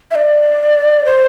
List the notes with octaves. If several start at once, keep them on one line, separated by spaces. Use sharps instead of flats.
E5
D5
C5